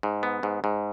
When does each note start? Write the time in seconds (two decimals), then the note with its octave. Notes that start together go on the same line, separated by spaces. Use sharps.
0.03 G#2
0.23 B3
0.43 G#2
0.64 G#2